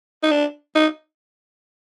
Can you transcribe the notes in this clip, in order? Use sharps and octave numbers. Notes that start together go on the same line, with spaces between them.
D#4
D4
D#4